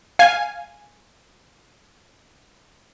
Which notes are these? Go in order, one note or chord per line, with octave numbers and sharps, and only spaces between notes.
F5 G#5